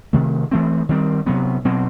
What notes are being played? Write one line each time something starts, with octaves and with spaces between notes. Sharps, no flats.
C3 D#3 A3
E3 A3 C4
D#3 G3 C4
C3 F#3 B3
B2 F#3 C4